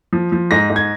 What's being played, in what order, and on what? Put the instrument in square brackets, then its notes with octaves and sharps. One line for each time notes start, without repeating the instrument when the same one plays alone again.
[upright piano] F3
F3
G#2 A#6
G#2
G#6